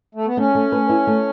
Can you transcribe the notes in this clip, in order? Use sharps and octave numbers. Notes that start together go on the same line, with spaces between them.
A3
B3
A3 C#4
A3
B4
E4
A3